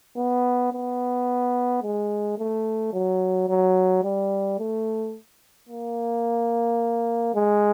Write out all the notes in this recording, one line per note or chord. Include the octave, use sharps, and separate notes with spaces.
B3
B3
G#3
A3
F#3
F#3
G3
A3
A#3
G#3